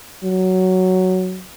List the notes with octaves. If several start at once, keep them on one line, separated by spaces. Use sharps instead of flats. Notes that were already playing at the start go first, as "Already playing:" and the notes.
F#3